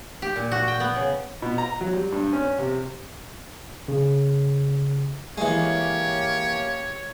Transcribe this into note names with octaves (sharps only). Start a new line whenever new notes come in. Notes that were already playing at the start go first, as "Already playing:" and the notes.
G4
A#2
F#4
G5
B3
C#3
B2
A#5
F#3
G3
G2
C#4
C3
C#3
E3 G#3 A#3 C#4 G4 C#5